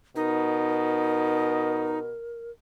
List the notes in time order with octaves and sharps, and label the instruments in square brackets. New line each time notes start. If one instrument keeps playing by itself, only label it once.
[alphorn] B2 [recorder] D#4 [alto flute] A#4